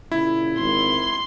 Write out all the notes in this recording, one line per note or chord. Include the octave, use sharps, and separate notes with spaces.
A#2 C#3 C#4 E4
G#1 C6